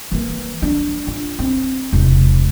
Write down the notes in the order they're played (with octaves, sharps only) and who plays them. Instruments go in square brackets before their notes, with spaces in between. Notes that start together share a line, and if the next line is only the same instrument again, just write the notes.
[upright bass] E3 A#3
D4
F4
C4
E1 C3